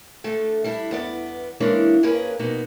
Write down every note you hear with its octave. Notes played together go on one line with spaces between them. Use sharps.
D3 A3
G3 D4 E4
E2 B3 D5
C#3 E3 G#3 A#3 C#4 D4
G2 A#3 C#4 G#4 A#4 B4
F2 B2 A#3 B3 D#4